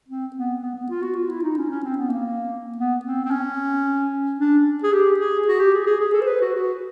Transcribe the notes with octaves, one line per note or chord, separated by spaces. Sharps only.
C4
B3
B3
B3
F4
F#4
F4
E4
D#4
C#4
C#4
C4
B3
A#3
B3
C4
C4
C#4
D4
G#4
G4
G#4
F#4
G4
G#4
G#4
G#4
A4
C5
B4
F#4
F#4